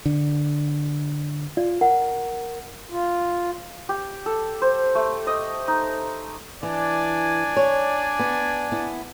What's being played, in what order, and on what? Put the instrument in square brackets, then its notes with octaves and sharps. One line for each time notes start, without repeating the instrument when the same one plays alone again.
[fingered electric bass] D3
[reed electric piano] F4 [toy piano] D5
[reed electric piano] A#4 [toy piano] F#5
[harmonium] F4
[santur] G4
A4
C5
A3
D#5
D#4
[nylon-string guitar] E3 [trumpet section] D4 D5 G#5
[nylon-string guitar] C#5
B3
B3 E4